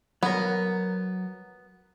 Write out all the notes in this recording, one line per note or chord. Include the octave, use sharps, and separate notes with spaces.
F#3 B3 A#4